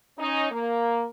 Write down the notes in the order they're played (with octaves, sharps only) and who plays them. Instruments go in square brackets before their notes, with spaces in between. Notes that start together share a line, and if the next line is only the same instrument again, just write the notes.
[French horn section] C#4 D#4
A#3